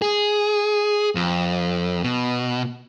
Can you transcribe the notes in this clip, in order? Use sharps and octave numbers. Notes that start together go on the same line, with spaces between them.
G#4
F2
B2